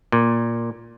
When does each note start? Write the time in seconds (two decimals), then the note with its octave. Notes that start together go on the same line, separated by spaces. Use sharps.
0.12 A#2